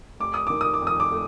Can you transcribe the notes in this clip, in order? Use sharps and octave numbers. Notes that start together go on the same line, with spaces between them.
F1 D6
D#6
D#3 D6
D#6
D6
F2
D#6
D6
A3